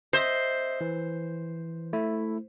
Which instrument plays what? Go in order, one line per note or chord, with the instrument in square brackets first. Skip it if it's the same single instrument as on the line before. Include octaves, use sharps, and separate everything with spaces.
[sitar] C5 [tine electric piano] D#5 E5
[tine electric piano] E3
A3 E4